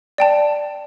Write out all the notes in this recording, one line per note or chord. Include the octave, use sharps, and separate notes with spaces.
D5 G5 A5